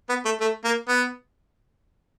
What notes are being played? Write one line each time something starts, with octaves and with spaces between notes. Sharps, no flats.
B3
A3
A3
A#3
B3